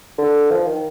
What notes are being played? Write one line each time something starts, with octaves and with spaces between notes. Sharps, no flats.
D3
F3
D#3